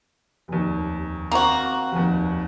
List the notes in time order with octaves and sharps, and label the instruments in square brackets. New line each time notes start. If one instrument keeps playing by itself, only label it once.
[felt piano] F1 D#2
[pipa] A#3 F#4 [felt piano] C4
[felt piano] F1 D#2